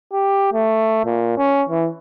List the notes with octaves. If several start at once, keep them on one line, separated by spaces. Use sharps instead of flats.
G4
A3
A#2
C#4
E3